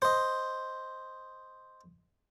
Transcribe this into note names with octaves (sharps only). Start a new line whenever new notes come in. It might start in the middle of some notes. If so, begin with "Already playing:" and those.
C5 D#5